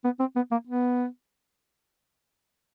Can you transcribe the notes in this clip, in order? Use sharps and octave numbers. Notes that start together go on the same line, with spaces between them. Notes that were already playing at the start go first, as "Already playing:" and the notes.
B3
C4
B3
A#3
B3